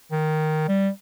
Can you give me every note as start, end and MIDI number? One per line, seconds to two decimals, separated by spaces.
0.12 0.67 51
0.68 0.89 55